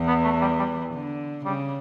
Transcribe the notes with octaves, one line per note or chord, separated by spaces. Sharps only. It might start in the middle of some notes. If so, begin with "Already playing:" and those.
Already playing: E2 E3
B3
A3
G3
G3
D3
C#3 G3